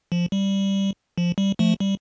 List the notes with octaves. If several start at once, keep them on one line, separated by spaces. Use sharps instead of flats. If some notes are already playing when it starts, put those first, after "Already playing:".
F3
G3
F3
G3
F3 A3
G3